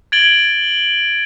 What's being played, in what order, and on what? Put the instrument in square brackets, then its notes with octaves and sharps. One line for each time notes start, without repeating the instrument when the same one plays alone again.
[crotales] G#6 A6 D7 F#7 G7